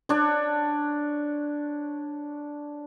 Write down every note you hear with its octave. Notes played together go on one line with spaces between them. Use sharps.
D4 C#5